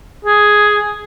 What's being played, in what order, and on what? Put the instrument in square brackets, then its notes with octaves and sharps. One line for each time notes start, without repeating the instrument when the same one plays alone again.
[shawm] G#4